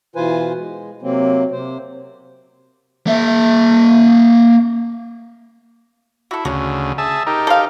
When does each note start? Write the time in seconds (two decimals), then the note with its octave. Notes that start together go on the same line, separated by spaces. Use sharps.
0.16 B2 E3 F4 B4 C5 G#5
0.57 G#3
1.02 C3 F#3 A#3 C4
1.52 C3 C5
3.07 A#3 E5
6.31 E4 F#4 A4
6.45 D2 C#3 C#4 F#4
6.98 G#4 E5 A5
7.27 D#4 G4 A#4
7.47 A4 C5 F5